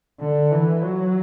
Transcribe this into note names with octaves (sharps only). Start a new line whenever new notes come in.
D3
E3
F#3